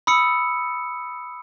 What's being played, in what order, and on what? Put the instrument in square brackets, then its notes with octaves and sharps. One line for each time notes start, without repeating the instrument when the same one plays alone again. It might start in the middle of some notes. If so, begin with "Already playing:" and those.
[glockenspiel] B5 D#6 E6 C#7